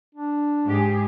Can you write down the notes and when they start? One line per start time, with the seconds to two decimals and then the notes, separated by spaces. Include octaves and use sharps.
0.15 D4
0.66 G#2 G4 G#4